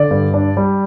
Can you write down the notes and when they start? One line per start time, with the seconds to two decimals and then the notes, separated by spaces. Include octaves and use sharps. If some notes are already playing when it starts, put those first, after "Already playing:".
Already playing: D3 D5
0.11 G2
0.34 D4
0.57 G3